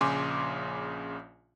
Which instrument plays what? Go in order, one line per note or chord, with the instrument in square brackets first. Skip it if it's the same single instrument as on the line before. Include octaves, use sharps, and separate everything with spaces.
[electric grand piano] A#1 C#3 G#5 C6 D6